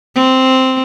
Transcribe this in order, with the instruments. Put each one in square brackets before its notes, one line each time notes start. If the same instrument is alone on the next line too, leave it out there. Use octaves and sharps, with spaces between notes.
[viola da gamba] C4